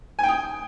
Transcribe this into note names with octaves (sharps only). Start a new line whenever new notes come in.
G5 G#5 D#6